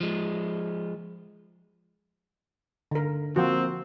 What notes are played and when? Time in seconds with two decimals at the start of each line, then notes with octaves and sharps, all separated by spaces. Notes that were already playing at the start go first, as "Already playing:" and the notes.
0.01 F3 G#3
2.91 D3 A#4
3.36 F3 A#3 C4 F#4